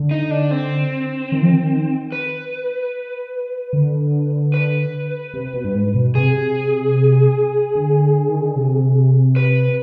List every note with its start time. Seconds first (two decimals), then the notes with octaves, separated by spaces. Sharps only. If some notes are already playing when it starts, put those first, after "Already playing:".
Already playing: D3
0.11 D#4
0.31 D4
0.51 C4
1.32 D#3
1.42 F3
1.53 D#3
2.12 B4
3.73 D3
4.54 B4
5.34 C3
5.54 B2
5.64 G2
5.74 G#2
5.95 B2
6.15 C3 G#4
7.75 D3
8.29 D#3
8.42 D3
8.56 C3
9.36 B4